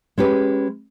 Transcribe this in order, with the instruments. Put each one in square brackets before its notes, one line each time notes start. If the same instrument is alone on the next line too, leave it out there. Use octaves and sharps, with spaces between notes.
[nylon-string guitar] G#3 C#4 G4 B4